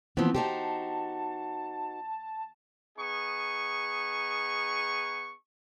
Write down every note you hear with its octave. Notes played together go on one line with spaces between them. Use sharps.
D#2 E3 F3 B3 C4
D#4 F#4 G4 C5 A5
B3 D#4 G#4 C#6